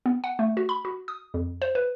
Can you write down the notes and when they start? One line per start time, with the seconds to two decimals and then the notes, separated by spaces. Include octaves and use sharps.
0.06 B3
0.24 F#5
0.39 A3
0.57 F#4
0.69 B5
0.85 F#4
1.08 D#6
1.34 F2
1.62 C5
1.75 B4